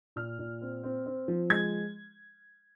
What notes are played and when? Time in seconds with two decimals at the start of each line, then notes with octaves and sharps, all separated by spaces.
0.16 A#2 F6
0.39 A#2
0.61 C4
0.83 C4
1.06 C4
1.28 F3
1.50 G#3 G#6